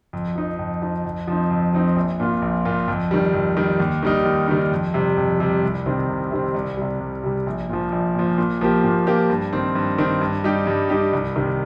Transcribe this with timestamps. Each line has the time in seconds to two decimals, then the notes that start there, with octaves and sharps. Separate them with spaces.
0.13 F2
0.36 F3 D#4
0.59 F2
0.82 F3 D#4
1.05 F2
1.28 F3 C4 D#4
1.51 F2
1.73 F3 C4 D#4
1.96 A#1
2.20 A#2 A#3 F4
2.42 A#1
2.65 A#2 A#3 F4
2.88 F2
3.11 D#3 G3
3.34 F2
3.57 D#3 G3
3.80 D#2
4.03 D#3 G3 D#4
4.25 D#2
4.48 D#3 G3 D#4
4.72 F2
4.94 C3 G3
5.17 F2
5.40 C3 G3
5.63 C2
5.86 C3 D#3 C4
6.09 C2
6.31 C3 D#3 C4
6.54 C2
6.77 C3 G3
7.00 C2
7.23 C3 G3
7.47 A#1
7.69 A#2 F3
7.92 A#1
8.15 A#2 F3
8.38 A#2
8.61 F3 A#3 G4
8.84 A#2
9.07 F3 A#3 G4
9.30 G2
9.53 D#3 C4
9.75 G2
9.98 D#3 C4
10.21 G2
10.44 G3 D#4 G4
10.67 G2
10.90 G3 D#4 G4
11.13 C2
11.36 C3 D#3